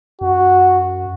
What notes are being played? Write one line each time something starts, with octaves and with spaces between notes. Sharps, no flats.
F#2 F#4